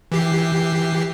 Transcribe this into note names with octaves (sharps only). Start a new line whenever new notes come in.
E3 G4 C7